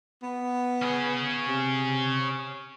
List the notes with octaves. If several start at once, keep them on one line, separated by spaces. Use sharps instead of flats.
B3
C#4 G#4
C3